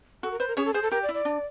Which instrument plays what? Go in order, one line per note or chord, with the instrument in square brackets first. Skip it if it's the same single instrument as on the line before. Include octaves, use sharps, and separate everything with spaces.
[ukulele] F#4 [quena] A4
[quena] A#4
[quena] B4 [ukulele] C5
[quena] A#4
[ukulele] C#4 C#5 [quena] G#4
[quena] A4
[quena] G#4 [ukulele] C5
[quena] A4
[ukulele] G4 [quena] A#4
[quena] D5
[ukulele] E4
[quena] D5
[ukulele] D4